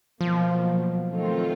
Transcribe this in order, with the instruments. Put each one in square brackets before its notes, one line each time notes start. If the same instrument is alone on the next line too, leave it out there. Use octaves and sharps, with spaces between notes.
[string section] B2 F#3 A#3 [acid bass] F3
[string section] D#3 F#3 A3 C4 F4